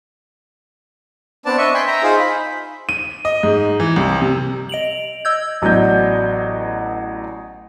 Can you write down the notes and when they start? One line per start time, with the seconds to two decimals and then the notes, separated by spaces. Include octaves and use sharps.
1.46 B3 C4 D4 D5 A5
1.58 D4 D#5 E5 C#6
1.74 G5 G#5 B5 C6
1.87 E5 G5 A#5
2.03 D#4 F4 G#4 C5
2.19 B5
2.89 D#7
3.25 D#5
3.43 G#2
3.80 E3
3.96 C2
4.21 C3
4.69 D#5 D7 F7 F#7
5.25 D#5 E6 G6 G#6
5.62 A1 F#3 B3 D4 D#5 G6